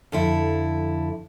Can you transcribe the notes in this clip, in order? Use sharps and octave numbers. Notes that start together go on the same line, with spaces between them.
F2 D3 E4